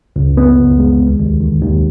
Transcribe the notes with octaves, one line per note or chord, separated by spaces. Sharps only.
C#2
B3
C#2
G#3
D#2
D#2
D#3
D#2